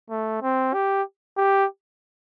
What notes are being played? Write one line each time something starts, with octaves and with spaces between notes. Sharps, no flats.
A3
C4
G4
G4